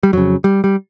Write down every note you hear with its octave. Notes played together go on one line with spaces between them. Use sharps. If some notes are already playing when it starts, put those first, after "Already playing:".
G3
F2 C#3 F#3
G3
G3